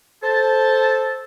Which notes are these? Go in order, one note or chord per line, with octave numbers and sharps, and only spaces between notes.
A4 C5 A5